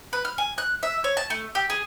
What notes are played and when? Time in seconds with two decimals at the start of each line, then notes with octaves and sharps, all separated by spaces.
0.13 B4
0.25 F6
0.38 G#5
0.58 F#6
0.83 E5
1.04 C#5
1.17 A5
1.30 A3
1.55 G4
1.70 G#4